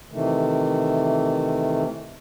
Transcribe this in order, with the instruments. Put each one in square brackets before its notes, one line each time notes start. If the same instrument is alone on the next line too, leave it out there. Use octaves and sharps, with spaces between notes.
[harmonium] C3 D#3 E3 A3